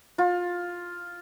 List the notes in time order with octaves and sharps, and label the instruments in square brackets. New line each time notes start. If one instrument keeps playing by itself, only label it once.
[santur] F4